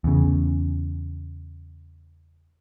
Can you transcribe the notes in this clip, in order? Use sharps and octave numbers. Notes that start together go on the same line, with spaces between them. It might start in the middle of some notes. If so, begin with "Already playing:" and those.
E2 C#3